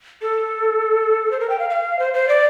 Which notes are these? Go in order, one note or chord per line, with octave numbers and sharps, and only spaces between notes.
A4
C5
A#4
G5
F5
F5
C5
C5
D5